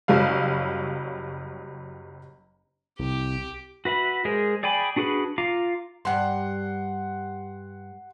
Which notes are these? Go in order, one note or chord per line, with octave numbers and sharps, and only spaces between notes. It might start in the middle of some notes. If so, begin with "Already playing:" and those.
F#1 F#3 G3 F5
C2 G4
F#4 B4 E5 B5
G#3 G#4 A#4 C5
G#4 D5 G5 G#5 B5
D4 F#4 G#4 B4 B5
F4 F5 A#5 D6
G2 G3 F#5 C6